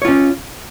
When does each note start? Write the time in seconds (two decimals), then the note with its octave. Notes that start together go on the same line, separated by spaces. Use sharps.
0.02 C#5
0.05 F4
0.08 C#4